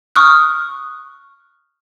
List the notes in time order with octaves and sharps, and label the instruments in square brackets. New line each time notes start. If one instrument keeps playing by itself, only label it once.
[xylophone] C#6 D#6 F6 F#6